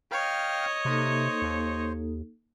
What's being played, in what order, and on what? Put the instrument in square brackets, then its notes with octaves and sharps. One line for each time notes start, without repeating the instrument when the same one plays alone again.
[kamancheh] C#5 D#5 [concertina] F5 G5 F6
[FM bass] C3 [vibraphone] A#3 D#4 A4 [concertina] C5
[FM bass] D#2